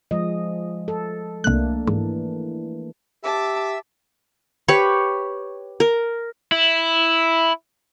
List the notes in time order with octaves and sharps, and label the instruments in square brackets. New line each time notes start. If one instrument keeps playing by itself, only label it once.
[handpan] F3 G#3 D#5
A4
[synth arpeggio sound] C2 F#6 [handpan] A3 A#3 D4
[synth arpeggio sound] G#2 [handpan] E3
[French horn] G4 [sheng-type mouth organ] E5 E6 [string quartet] A5 D6
[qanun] G4 B4 C#5 C#6
A#4
[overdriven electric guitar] E4